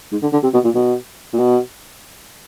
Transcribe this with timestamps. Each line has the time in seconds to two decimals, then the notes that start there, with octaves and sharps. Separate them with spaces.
0.12 G#2
0.22 D3
0.33 D3
0.43 C3
0.54 B2
0.64 A#2
0.75 B2
1.33 A#2
1.39 B2